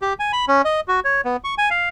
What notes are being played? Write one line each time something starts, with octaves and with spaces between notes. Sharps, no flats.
G4
G#5
B5
C#4
D#5
F#4
C#5
B3
C#6
G#5
F5